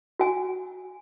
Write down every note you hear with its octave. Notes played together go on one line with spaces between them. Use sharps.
F#4 G#5